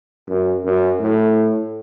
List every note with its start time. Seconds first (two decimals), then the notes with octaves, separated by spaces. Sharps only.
0.28 F#2
0.65 F#2
1.00 A2